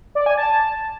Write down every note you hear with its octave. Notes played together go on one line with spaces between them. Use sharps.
D5
G#5
A5